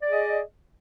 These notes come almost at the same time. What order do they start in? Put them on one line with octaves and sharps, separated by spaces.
D5 G#4 D#5